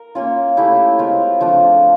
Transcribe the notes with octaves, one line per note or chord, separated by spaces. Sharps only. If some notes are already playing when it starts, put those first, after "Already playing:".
Already playing: A#4
A#3 C#4 F4
A3 C#4 E4 G4
G#3 C4 F4 A#4
F3 A3 D4 F4